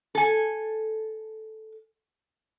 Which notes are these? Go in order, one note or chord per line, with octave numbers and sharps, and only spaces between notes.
A4 G#5